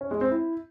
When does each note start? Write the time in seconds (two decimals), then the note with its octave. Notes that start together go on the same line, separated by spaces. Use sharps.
0.01 C#4
0.11 G#3
0.21 C4
0.31 E4